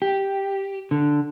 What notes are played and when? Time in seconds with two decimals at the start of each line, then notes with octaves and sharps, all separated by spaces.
0.02 G4
0.91 D3